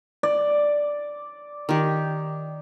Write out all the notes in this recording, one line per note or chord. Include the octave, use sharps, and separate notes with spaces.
D5
D#3 G4